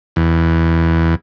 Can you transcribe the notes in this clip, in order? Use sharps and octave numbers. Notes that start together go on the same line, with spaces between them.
E2